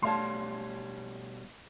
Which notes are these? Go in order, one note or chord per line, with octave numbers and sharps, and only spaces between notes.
B2 G3 A3 D4 C#5 F5 A5 C6